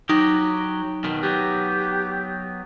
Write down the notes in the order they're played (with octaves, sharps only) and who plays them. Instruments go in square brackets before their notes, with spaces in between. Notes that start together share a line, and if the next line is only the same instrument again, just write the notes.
[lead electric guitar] F#3 G4 [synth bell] D#4
[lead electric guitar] B2 D#3
[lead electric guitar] F#3 B3 [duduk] G4